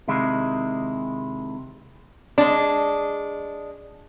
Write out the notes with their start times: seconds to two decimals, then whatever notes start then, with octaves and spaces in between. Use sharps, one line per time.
0.08 C3 D#3 G#3 E4
2.38 G#3 D4